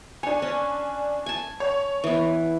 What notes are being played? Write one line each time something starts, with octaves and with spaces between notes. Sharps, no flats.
D4 C#5 G#5
C#4
G#5 A5
C#5
E3 B3